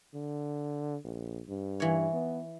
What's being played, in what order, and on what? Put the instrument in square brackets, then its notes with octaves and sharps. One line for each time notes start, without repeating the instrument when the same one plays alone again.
[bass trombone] D3
A#1
G2
[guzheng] E3 C#5
[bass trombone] B3